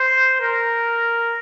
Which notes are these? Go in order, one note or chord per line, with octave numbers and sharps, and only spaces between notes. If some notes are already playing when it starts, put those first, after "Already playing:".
Already playing: C5
A#4